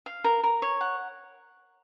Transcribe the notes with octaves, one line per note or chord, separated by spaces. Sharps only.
F5
A#4
A#4
C#5
F#5